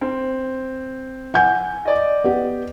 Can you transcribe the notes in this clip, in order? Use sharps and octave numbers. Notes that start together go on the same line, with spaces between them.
C4
F#5 G#5 G6
D5 D#5
B3 G4